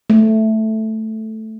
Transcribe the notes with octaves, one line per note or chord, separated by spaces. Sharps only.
A3